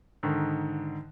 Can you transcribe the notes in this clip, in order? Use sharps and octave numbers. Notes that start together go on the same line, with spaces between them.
G#2 D3 D#3